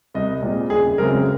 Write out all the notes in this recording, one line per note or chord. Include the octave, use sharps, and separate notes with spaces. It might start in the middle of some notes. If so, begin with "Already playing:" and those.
C2 D#5
A#2 G#3 C4
F#1 G#4
F#2 C#3 G#3 C4 A#4